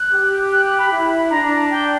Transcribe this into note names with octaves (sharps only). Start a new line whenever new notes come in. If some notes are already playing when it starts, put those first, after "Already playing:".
Already playing: F#6
G4
F#6
F#6
B5
E4
D4 A#5
G5